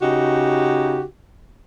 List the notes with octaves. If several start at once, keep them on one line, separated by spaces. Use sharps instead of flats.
C#3 D#4 F#4 G4